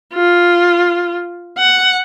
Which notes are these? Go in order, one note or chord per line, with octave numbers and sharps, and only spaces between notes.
F4
F#5